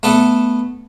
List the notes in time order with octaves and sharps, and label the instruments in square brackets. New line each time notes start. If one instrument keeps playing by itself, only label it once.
[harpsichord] A3 B3 A4